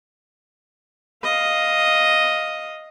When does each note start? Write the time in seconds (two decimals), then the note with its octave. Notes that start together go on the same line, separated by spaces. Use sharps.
1.23 D#5 F5